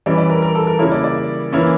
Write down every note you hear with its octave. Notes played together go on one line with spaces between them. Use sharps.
E3 G3 C#4 D5
D5
A#4
A#4
A4
A#4
C#3 G3 A#3 E4 C#5
D5
D5
E3 A#3 C#4 E4